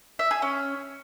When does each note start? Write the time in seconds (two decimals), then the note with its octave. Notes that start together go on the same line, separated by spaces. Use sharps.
0.19 E5
0.31 G#4
0.42 C#4